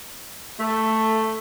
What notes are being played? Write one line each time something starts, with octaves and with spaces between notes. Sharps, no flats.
A3